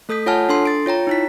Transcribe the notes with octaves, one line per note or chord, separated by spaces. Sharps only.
A3 A4 D#6 G6 B6
F4 C#5 F#5 G#5 A5 F6
D4 A4 C6 C7
A6 D7
F4 C#5 G5 A#5
D#4 E4 B6